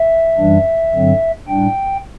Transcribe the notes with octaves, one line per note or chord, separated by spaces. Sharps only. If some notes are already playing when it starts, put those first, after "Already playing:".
Already playing: E5
F#2 E3 G3 D4
G2 D3 F#3 C4
A2 G3 D4 G5